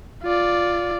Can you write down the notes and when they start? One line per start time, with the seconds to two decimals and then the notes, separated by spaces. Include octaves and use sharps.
0.23 F4 D5